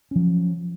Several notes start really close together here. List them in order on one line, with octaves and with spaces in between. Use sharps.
C#4 F3 F#3